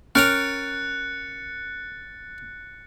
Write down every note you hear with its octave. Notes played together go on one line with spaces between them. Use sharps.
C#4 A#4 G5 A#5 F#6 A6 C#7